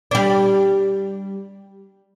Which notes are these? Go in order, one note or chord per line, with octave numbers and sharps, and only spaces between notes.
G3 D4